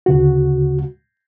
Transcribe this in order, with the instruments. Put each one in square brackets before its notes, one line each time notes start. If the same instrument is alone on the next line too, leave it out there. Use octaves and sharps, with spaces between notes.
[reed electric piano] D2 C#3 F#4